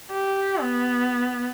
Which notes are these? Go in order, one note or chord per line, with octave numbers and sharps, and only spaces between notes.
G4
B3